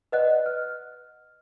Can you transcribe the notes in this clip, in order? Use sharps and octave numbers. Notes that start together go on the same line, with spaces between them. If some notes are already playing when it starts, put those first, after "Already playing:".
B4 D5 D#5 F#5 F#6
F6